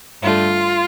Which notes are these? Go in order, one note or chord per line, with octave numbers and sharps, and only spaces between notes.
G2 D3 A3 F4